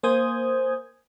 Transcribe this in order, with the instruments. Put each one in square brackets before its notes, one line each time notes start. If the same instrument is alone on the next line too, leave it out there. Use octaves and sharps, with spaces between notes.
[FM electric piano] A#3 C5 G#5 D#6 G6 G#6